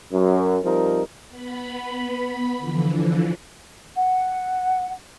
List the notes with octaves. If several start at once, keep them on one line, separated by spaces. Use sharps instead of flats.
F#2
F3 G3 C4 D#4 A#4
B3 B5
D3 E3 F3
F#5